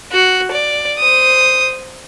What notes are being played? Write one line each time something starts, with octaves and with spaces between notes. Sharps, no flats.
F#4
D5
C5 D#6